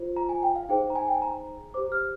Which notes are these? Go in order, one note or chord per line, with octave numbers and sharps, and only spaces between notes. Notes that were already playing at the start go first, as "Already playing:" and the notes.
Already playing: F4 C5
A#5
G#5
G5
F5
D#4 G#4 C5 G5
A#5
G#5
G5
G#5
A#5
G4 C5 D6
F6